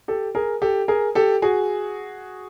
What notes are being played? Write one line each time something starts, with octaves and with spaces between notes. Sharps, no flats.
G4 A4
G#4 A#4
G4 A4
G#4 A#4
G4 A4
F#4 G#4